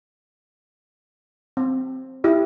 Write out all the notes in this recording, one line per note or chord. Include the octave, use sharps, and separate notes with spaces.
C4
E4 G4 D#5